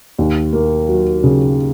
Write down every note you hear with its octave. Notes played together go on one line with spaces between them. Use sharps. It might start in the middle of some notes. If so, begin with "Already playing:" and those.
D#2
A#3
F#3
C#3